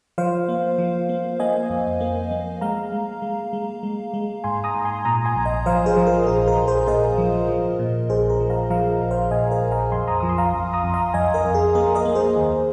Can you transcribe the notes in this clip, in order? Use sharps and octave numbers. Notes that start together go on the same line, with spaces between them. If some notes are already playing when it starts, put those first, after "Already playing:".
F3 C5 F5
A#3
F3
A#3
A#3 D#5 G#5
F2
A#3
A#3
G#3 F5 A#5
G#3
G#3
G#3
G#3
G#3
G#2 G#5 C6
A#5 D#6
G#2
G#5 C6
A#2 A#5 D#6
G#5 C6
A#1
D#5 G#5
F3 C5 F5
G#4 C5
F3
A#4
A#1 G#4
A#4
A#1
G#4 C5
A#2 A#4 D#5
F3
F3
A#2
A#1 G#4 C5
A#4
F3
F5 A#5
F3 F5 A#5
A#1
C5 F5
A#2 D#5 G#5
A#4 D#5
A#1
F5 A#5
F2 G#5 C6
A#5 D#6
F3 D#6
C6
F5 A#5
F2
A#5 D#6
F2
F5 A#5
F2 D#5 G#5
A#4 D#5
F2
G#4
A#3 A#4
A#4 D#5
A#3
G#4 C5
D#2